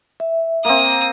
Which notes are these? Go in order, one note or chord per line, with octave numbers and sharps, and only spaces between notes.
E5
A#3 C4 D#6